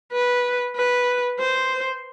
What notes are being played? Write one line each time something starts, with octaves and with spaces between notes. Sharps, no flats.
B4
B4
C5